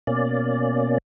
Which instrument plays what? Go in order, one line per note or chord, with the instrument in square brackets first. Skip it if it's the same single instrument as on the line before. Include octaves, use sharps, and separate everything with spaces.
[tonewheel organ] B2 A#3 C#4 D5